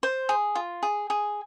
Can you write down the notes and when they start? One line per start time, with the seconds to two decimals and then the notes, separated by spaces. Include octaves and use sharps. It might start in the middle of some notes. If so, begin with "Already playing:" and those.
0.03 C5
0.29 G#4
0.55 F4
0.83 G#4
1.10 G#4